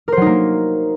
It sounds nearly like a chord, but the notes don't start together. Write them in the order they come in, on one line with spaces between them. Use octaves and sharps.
A#4 C5 F#3 D#4 A#3